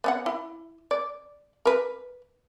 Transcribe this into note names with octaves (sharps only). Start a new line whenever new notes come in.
B3 C#4 F#5
E4
D5
A#4 B4